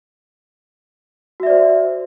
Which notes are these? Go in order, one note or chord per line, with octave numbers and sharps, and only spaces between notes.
F#4 C5 D5 E5